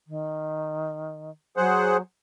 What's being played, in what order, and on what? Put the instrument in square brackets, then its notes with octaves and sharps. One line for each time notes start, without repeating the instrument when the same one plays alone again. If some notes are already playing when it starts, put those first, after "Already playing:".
[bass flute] D#3
[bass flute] F#3 [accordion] G#4 C5 F#5